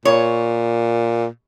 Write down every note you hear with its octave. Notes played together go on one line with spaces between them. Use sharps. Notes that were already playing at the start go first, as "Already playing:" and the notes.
A#2 C#5